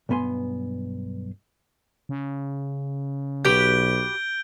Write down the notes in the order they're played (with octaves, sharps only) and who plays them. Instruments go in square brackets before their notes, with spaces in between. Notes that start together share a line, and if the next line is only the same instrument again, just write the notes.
[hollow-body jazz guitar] B1 G2 B3 G#5 C6
[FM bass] C#3
[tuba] B1 [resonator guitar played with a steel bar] F#4 G4 B4 [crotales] G6 D7 G7